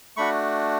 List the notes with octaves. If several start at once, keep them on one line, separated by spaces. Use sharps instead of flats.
A3 D4 F#4 B5 C#6